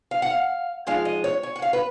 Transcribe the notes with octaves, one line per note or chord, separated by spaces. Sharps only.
F5
F#5
F5
F3 G#3 D#4 F5
D#5
C#5
C#5
F#5
F5
B4